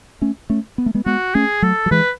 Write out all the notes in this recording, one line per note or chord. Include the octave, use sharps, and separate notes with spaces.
A3 C#4
A3 C#4
B3
A3
G#3 B3
G#3 B3 F#4
A3 C#4 G#4
F#3 A3 A4
F#3
E3 G#3 B4